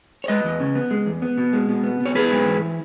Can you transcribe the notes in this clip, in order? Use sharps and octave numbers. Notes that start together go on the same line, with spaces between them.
C#5
G#3 B4 D#5
E2
C#3
B3
G#3
E2
B3
B2
G#3
B2
B3
B2
C#5
B3 G#4 B4
G#2
E3